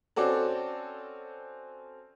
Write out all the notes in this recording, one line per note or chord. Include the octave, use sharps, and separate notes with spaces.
C4 C#4 F#4 A4 D5